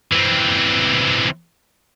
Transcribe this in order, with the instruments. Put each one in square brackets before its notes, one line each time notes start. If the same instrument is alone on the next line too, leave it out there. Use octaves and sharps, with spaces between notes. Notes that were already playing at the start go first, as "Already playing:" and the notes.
[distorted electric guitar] E3 C4